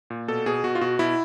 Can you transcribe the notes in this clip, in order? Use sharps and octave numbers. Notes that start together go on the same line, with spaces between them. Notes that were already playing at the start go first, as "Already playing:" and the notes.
A#2
B2 A4
B2 G#4
B2 F#4
F4
B2 F#4
B2 E4